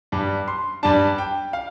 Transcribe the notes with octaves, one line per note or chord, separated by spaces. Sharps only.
G2 G3 D4
C6
G2 G3 D4 A5
G5
F5